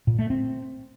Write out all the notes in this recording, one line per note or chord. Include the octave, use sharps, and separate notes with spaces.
A#2
A3
C4